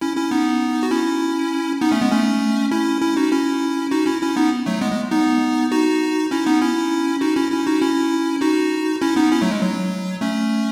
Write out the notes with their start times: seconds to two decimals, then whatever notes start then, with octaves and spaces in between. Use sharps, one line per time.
0.01 C#4 E4
0.17 C#4 E4
0.31 B3 D#4
0.83 F#4
0.91 C#4 E4
1.81 B3 D#4
1.91 A3 C#4
2.01 G#3 B3
2.11 A3 C#4
2.71 C#4 E4
3.01 C#4 E4
3.17 D#4 F#4
3.32 C#4 E4
3.91 D#4 F#4
4.06 C#4 E4
4.22 C#4 E4
4.37 B3 D#4
4.66 F#3 A3
4.81 G#3 B3
4.92 G#3
5.11 B3 D#4
5.71 D#4 F#4
6.31 C#4 E4
6.46 B3 D#4
6.62 C#4 E4
7.21 D#4 F#4
7.36 C#4 E4
7.51 C#4 E4
7.67 D#4 F#4
7.81 C#4 E4
8.41 D#4 F#4
9.02 C#4 E4
9.16 B3 D#4
9.32 C#4 E4
9.41 F#3 A3
9.51 G#3
9.62 F#3
10.21 A3 C#4